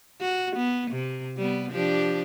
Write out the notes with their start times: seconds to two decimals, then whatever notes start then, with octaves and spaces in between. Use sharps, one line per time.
0.21 F#4
0.56 B3
0.91 C3
1.37 G3 B3
1.72 F3 D4 G4